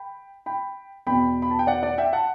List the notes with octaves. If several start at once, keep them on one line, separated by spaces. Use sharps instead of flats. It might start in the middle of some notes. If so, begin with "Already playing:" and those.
Already playing: G5 B5
G5 B5
E2 B2 G5 B5
B5
A5
G5
D5 F#5
D5 F#5
E5 G5
F#5 A5